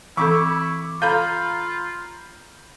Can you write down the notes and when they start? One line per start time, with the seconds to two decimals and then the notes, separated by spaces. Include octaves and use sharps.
0.17 E3 C4 E4 A4 C#6 D6
1.02 F4 A4 F5 A#5 B5 G6